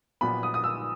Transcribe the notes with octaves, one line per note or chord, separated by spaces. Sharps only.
A#1 A#2 F#3 B3 B5
D#6
D#6
E6